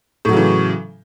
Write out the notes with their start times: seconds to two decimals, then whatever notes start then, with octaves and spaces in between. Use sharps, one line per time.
0.25 A2
0.29 F#3
0.33 C#3
0.37 E3